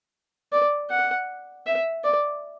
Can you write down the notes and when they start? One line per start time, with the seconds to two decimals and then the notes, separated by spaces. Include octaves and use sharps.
0.52 D5
0.90 F#5
1.66 E5
2.04 D5